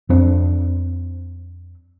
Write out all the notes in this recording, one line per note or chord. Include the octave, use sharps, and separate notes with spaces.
F2 C4 D4